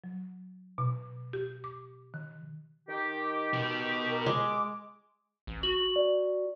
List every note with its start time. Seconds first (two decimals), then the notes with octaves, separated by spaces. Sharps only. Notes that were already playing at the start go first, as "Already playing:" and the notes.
0.04 F#3
0.78 B2
1.33 G4
1.64 D6
2.14 D#3
2.88 D#3 G4
3.53 B2 B3
4.10 A#4
4.26 G#3 D6
5.47 A1
5.63 F#4 F#7
5.96 D5